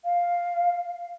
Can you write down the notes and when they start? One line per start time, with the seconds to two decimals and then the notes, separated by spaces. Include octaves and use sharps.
0.05 F5